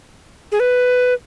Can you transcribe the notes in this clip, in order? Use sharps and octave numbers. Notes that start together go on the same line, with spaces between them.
G#4
B4